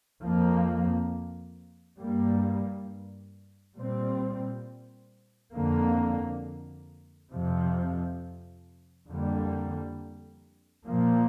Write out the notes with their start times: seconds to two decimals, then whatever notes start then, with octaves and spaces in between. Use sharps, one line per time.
0.21 F2 F3 A#3
1.98 G2 G3 A#3
3.76 A#2 G3 C4
5.53 F2 D3 A#3
7.31 F2 C3 F3
9.08 F2 D3 G3 A#3
10.85 A#2 F3 A#3